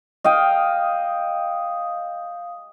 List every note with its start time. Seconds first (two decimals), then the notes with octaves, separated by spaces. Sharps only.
0.24 D#5 F5 G5